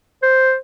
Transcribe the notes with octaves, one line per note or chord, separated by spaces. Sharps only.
C5